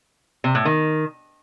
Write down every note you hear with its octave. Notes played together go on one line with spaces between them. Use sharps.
C3
A2
D#3